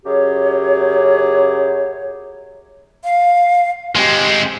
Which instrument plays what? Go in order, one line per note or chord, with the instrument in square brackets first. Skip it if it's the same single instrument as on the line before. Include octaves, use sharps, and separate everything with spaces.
[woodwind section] F#2 C#3 G4 G#4 C#5
[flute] F5
[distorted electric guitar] G#3 C4 [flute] G4